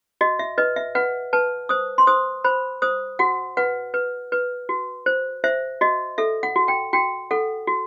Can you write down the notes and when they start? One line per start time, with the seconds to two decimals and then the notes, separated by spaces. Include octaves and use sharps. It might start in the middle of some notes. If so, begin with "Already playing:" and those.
0.21 F#4 D#5
0.39 E5
0.58 B4 D#5
0.76 E5
0.95 B4 F#5
1.33 B4 A5
1.69 C5 D#6
1.98 C6
2.07 C5 D#6
2.44 C5 B5
2.82 C5 D#6
3.19 F#4 F#5
3.57 B4 F#5
3.94 B4
4.32 B4
4.69 F#4
5.06 C5
5.44 C5 E5
5.81 F#4 D#5
6.18 A4 E5
6.43 F#5
6.56 F#4
6.68 G5
6.93 F#4 G5
7.31 A4 F#5
7.67 F#4